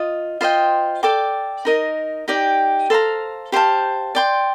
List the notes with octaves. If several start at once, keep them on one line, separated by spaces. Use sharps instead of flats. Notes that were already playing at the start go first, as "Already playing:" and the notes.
Already playing: F4 D#5
F4 C5 D#5 G5
A4 D5 G5 D6
D#4 A#4 D#5
D#4 G4 D5 G5
A4 C5 F5 A#5
G4 C5 F5 A5
D5 G5 C6